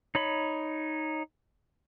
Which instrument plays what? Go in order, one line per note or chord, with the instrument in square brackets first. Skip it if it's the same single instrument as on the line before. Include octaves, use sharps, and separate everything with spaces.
[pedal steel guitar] D#4 C#5 B5